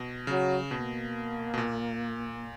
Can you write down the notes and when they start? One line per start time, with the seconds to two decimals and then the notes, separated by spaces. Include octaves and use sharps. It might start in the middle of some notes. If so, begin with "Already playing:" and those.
Already playing: B2
0.27 C#3 F#3
0.71 B2 A#3
1.54 B2
1.58 A#2